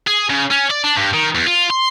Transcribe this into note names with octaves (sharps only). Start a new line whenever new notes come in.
G#4
C#3
C#4
D5
D4
G2
D#3
E2
F4
C6